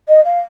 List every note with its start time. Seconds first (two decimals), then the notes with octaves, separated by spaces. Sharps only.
0.08 D#5
0.25 F5